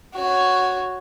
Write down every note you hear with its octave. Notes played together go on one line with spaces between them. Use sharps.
F#4 C#5